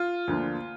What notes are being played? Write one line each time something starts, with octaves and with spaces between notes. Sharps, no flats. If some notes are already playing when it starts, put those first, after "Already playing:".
Already playing: F4
D2 D3 F3 A#3